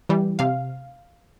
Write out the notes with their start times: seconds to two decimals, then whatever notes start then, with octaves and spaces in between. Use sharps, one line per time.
0.09 E3 G3
0.39 C3 F5